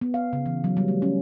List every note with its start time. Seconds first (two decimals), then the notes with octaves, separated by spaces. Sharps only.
0.01 B3
0.14 F5
0.33 C#3
0.46 E3
0.64 F#3
0.77 G3
0.88 A3
1.02 C#4